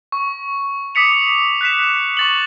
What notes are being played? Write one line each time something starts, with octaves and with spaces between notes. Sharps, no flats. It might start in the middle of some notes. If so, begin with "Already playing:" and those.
C#6
D6 D#6 B6 C#7 F7
F#6 B6 E7
C#6 A6 F#7